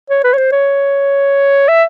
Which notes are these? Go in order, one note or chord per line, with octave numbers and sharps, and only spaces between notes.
C#5
B4
C#5
C5
C#5
E5